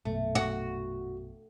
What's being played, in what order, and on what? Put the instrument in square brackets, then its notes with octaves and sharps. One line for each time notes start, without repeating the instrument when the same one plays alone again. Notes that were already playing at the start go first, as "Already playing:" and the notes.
[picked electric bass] A#1 F#2 B2 [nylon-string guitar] A3
[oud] F#4